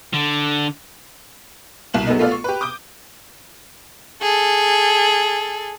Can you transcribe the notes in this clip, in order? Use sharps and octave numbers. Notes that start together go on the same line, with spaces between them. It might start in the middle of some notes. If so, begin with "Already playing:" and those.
D3
C2 B2 E7 F#7
F#3 G#3 A3 B3 D#4
A3 B3 F4 A4 D5 F5
C#6
G4 B4
D6 D#6 G6 D7
G#4 A4